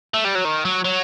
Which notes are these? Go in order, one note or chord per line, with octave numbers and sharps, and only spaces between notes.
A3
G3
F#3
D#3
F#3
F#3